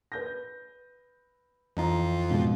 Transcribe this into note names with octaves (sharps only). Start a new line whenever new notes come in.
B4 G6 A#6
F2 E3 F4 D#5 A#5
G#2 B2 G#3